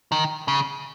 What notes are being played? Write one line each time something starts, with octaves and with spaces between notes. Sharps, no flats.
D#3
C#3